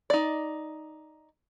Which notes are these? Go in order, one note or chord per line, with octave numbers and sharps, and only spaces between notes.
D#4 D5